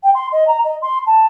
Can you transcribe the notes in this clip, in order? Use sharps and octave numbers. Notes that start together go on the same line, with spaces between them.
G5
C6
D#5
A#5
D#5
C6
A5